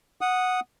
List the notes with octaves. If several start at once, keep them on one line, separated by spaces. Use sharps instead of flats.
F#5 D#6